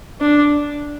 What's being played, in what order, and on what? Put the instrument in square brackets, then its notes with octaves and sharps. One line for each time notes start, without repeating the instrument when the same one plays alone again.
[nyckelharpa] D4